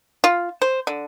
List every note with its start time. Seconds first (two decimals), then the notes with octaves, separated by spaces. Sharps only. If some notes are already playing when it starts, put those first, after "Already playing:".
0.24 F4
0.62 C5
0.87 D3